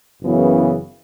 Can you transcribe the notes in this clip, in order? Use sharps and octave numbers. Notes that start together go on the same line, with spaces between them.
F#1 F#2 C#3 E3 B3